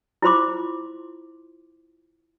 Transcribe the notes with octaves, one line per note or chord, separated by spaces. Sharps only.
E4 F4 C5 C6 D6